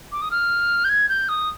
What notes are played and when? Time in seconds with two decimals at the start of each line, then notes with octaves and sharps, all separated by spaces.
0.12 D6
0.22 D#6
0.31 F6
0.84 G6
0.89 G#6
1.09 G6
1.29 D#6